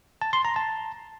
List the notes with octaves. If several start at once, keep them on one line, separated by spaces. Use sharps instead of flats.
A5
C6
A#5
A5